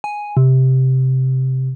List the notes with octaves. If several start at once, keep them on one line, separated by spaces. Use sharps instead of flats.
G#5
C3